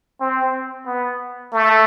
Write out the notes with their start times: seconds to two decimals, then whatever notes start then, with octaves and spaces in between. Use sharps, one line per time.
0.21 C4
0.86 B3
1.53 A3